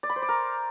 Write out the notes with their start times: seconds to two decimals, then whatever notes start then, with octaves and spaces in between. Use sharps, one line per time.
0.03 D5
0.10 B5
0.16 C5
0.22 D5
0.29 A#4